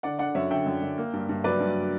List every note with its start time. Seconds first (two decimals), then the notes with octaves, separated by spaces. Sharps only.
0.03 D3 D5 F#5
0.19 D3 D5 F#5
0.35 F#2 C#5 E5
0.50 D3 E5 G5
0.66 F#2
0.82 F#2
0.98 A#3
1.13 G2
1.29 G2
1.44 F#3 B4 D5
1.60 G2